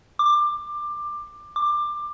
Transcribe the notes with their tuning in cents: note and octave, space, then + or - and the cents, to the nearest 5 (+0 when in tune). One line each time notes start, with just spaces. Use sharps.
D6 +20
D6 +20